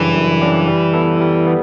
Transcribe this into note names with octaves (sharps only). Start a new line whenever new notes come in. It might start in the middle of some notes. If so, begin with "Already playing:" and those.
Already playing: F#2 C#3 E3 G3 D4 G4
F#2
C#3 G3 D4 G4
G3
B3 E4 A4
G3
B3